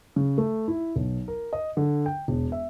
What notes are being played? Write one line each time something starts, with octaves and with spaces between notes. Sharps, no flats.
C#3
A3
E4
B1
A#4
D#5
D3
G5
E1
E5